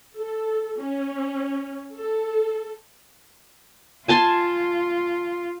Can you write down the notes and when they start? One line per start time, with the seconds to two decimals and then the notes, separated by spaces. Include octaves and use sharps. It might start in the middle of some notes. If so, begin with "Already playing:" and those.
0.18 A4
0.80 C#4
1.98 A4
4.08 F4 G#5 A5 C6